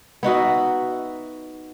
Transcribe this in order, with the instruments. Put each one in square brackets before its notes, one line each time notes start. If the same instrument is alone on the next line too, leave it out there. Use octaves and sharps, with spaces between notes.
[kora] B3 D#4 F#4 E5